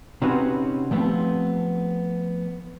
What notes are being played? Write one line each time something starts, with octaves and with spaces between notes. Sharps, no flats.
C3 C4 C#4 D#4 F#4 B4
F3 A3 B3 C4 G4